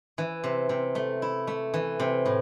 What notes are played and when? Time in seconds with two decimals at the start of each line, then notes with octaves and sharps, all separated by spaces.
0.18 E3
0.44 C3
0.69 C3
0.95 A3
1.22 E4
1.47 A3
1.74 E3
1.99 C3
2.26 A2